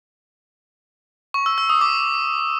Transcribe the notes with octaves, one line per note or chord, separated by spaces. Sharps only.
C#6
E6
E6
D#6
D6